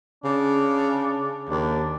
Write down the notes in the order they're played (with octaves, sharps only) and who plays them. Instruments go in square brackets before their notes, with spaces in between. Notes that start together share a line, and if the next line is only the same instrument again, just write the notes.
[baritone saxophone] C#3 [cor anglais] D4
[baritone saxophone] D#2 [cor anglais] D4